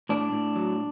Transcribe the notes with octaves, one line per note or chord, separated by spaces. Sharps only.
A2 D4
A2
F#3